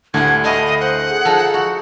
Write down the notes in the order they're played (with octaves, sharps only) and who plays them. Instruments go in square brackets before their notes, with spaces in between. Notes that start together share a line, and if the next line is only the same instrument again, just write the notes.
[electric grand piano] D2 A2 [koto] D3 G3 F#5 [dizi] G#6
[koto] A3 F5 A5 [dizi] D#5 [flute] B5
[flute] C5 [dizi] F#5
[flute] G#4
[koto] F3 D#4 [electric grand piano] A4
[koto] F#4